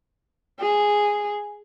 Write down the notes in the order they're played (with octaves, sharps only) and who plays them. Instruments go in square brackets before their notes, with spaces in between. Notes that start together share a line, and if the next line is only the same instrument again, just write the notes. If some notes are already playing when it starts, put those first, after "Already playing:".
[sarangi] G#4